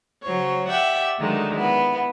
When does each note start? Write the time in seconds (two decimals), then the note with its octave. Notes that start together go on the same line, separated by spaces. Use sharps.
0.23 C#3 F#3 C5 C#5
0.69 G4 D5 E5 F#5 G5
1.19 D3 D#3 F#3 G#3 A3 D#4
1.56 B3 E4